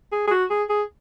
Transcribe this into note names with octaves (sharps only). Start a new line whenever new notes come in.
G#4
G#4
F#4
G#4
G#4